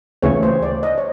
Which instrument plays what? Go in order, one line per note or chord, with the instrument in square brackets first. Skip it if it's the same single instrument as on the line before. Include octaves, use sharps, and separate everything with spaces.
[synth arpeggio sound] D2 C#3 E3 A3 [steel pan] C#5
[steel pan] C5
D5
D#5
C#5